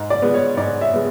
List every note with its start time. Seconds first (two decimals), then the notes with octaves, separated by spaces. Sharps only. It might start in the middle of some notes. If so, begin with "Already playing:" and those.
Already playing: G#2
0.10 D5
0.22 G#3 B3
0.34 C#5
0.57 G#2 D5
0.81 E5
0.93 G#3 B3